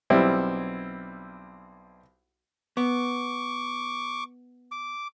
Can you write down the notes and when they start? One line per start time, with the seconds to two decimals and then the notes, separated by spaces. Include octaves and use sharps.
0.10 B1 G3 C4 E4 E5
2.77 B3 C#6 D6
4.71 D6